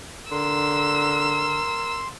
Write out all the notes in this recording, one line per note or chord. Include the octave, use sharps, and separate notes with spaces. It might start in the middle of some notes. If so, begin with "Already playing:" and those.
D3 A#4 C6 E6